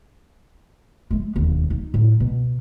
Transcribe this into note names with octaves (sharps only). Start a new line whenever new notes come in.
G#3 A3
E1 D#2
D#4
A2 F#3
B2